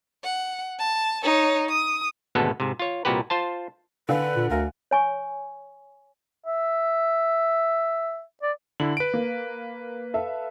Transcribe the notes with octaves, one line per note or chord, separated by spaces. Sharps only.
F#5
A5
D#4 C#5
D#6
G#1 D2 B2 G#3 B3 A4
G#2 C3
F4 C#5
C2 A#2 F#4 G4 B4
F4 C5 A5
D3 B4 F5 G5 G#5
A#2
D2 A#4 D5 F5 G#5
C#5 G#5 C#6
E5
D5
D3 E4 F#7
B4 D7
A#3
A4 E5 F5